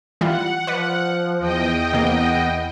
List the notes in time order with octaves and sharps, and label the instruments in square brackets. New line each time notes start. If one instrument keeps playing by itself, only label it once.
[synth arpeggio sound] E3 G3 F4 [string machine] F#5
[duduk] F3 [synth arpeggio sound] B4 D5
[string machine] E2 D#5 G5
[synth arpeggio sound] C3 A#3 [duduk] B3